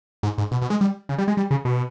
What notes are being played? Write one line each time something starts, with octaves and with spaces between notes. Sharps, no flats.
G#2
G#2
B2
B2
G#3
G3
C#3
G3
G#3
G3
C#3
B2